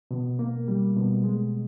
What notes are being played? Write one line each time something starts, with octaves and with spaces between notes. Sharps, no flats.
B2
A#3
G3
B2
G#3